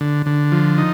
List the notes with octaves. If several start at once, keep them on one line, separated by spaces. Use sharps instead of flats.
D3
D3
F3
D#4